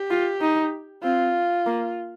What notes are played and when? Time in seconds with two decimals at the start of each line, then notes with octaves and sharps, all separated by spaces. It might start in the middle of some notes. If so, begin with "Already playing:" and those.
Already playing: G4
0.10 F4
0.41 D#4
1.03 C4 F4
1.66 A#3